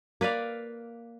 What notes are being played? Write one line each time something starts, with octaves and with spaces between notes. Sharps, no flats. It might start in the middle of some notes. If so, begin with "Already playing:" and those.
A#3 B4 D5 F5